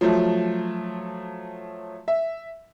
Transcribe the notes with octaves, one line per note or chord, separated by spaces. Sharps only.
F3 F#3 A3
E5